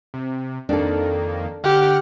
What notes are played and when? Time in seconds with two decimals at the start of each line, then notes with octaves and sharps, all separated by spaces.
0.14 C3
0.69 F2 D#3 A#3 D4 A4
1.64 D3 G4 F#5 F6